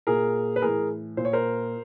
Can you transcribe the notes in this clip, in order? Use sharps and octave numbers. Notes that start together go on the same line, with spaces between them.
A#2 G#4 A#4
B4
A2 E3 G#4 A#4
A#2 C5
C#5
A#4 C5